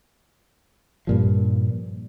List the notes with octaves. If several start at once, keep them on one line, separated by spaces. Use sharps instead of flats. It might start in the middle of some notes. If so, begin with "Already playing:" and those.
G2 A#2 F3